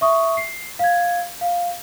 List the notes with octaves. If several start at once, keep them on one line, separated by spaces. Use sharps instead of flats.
E5 C#6 D#6
C7
F5 G#6
F5